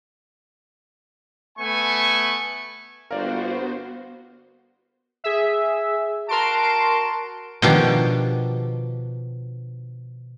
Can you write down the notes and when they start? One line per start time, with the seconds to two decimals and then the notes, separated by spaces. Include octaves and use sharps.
1.58 A3 B3 G#5 C#6
3.11 G1 A#3 B3 F#4 A#4 C5 D5
5.24 G#4 E5
6.29 F#4 A#4 A5 C6 D7
7.62 B2 D#3 F3 D4 G4